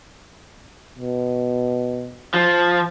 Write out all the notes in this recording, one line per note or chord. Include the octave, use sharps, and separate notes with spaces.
B2
F3